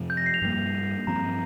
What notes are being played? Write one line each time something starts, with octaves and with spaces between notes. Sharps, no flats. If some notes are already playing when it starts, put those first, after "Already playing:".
Already playing: F2 C3 F3
G6
A#6
C7
F7
G2 G3 A#3
G2 F3 C4 A#5